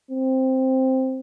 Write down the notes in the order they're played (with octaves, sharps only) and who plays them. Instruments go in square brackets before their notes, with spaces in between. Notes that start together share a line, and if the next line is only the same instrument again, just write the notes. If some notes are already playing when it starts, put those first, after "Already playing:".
[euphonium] C4